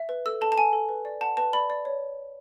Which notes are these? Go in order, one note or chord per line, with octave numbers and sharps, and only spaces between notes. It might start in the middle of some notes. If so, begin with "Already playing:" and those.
Already playing: E5
B4
A4 E6
A4 A5
A5
A4 G#5
A4
B4
D5
F#5 A5
B4 A5
D5 B5
D5
C#5